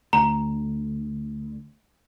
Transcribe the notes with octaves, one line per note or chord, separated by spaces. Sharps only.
D2 A#5